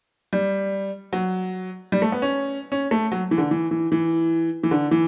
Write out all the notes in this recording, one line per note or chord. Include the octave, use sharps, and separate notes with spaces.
G3
F#3
G3
A3
B3
C#4
C#4
A3
F#3
E3
D3
E3
E3
E3
E3
D3
E3